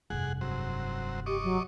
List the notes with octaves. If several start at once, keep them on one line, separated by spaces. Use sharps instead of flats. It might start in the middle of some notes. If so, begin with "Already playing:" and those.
F1 G2 G#4 F#5
F#3 C4
G4 D#5 C#6 D6
F#3